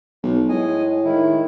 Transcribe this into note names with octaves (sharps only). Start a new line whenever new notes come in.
B1
A2 G#3 D#5 G#5
D#3 G#3 E4